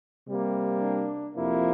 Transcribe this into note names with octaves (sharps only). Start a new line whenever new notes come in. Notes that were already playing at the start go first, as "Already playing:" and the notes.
C3 G3 A#3
D4
F2 C3 F3 A#3 E4